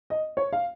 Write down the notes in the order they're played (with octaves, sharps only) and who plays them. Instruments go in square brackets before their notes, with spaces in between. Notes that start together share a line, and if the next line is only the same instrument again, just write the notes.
[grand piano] D#5
C#5
F5